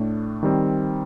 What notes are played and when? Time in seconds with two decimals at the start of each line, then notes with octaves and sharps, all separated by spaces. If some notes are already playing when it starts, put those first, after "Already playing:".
Already playing: A2 A3 D4
0.43 D#3 G3 C4